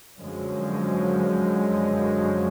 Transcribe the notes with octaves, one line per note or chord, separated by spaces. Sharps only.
F#2 D3 F3 G#3